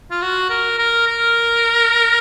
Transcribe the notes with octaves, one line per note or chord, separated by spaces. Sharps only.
F4
F#4
A#4
A#4
A#4